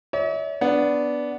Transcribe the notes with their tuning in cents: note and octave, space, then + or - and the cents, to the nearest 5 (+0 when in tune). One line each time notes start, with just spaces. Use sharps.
C#5 +45 E5 -45
B3 +0 D4 -10